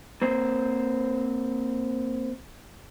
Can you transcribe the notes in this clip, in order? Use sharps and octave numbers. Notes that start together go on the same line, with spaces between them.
A#3 C4 C5